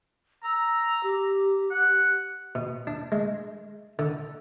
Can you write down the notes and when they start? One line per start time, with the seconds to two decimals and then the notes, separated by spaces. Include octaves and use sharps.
0.44 A#5 E6
1.03 G4
1.71 F#5
2.55 B2
2.87 D4
3.12 G#3
3.99 D3